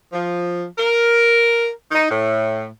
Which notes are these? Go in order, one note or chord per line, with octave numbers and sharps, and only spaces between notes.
F3
A#4
D#4
A2